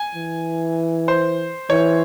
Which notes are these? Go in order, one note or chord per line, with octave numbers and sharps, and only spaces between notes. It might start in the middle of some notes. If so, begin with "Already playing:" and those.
Already playing: G#5
E3
C5
E3 C#5